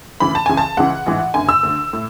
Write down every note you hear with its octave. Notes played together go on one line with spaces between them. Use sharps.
D2 C#3 E3 B5
A5
C#2 C#3 E3 G#5
A5
C#2 C#3 E3 F#5
A1 G#2 E3
F#1 F#2 D3 G#5
E6
D2 D3
A2